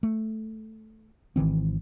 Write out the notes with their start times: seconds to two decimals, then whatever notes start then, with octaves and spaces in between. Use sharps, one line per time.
0.03 A3
1.36 G#1 D#3 E3 C4